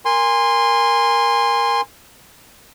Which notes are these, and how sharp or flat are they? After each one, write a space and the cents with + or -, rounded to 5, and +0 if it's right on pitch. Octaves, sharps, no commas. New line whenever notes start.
A#4 +0 G#5 -25 C6 +0